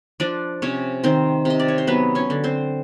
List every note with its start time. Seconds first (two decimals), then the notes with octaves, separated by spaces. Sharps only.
0.20 F3 D4 D5
0.62 C3 C#4 C#5
1.04 D#3 C4 C5
1.45 C3 D#5
1.60 D5
1.68 C#5
1.78 C5
1.87 F#3 B3 B4
2.15 C#4 C#5
2.30 D3
2.44 C4 C5